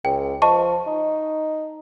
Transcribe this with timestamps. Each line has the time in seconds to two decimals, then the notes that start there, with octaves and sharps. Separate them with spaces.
0.05 C#2 G5
0.42 F3 D#5 A5 C#6
0.87 D#4